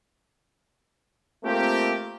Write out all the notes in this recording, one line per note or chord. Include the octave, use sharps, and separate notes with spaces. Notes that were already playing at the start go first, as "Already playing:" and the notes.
A3 A#3 C4 F4 G4